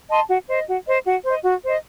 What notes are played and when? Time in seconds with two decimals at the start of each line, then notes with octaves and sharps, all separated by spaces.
0.09 D#5 A5 C6
0.28 F#4
0.48 C5 D#5
0.67 F#4
0.86 C5 D#5
1.05 F#4
1.24 C5 D#5
1.44 F#4
1.63 C5 D#5